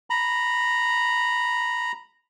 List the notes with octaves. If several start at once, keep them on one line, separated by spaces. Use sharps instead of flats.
A#5 B5